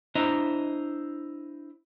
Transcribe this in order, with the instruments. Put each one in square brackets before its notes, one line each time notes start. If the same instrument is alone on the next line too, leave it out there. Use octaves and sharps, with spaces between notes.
[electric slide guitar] D4 E4 C5 D#5 A#5